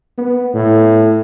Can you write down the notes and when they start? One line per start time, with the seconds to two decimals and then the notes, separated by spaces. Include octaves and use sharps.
0.18 B3
0.54 A2